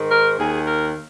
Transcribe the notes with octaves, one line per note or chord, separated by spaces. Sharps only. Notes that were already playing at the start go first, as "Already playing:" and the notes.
Already playing: G#2 D#3
A#4
D#2 D#3 G#4
A#4